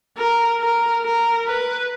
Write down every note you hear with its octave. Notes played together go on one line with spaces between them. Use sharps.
A#4
A#4
A#4
B4